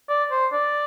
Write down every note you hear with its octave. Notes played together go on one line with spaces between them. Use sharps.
D5
C5
D5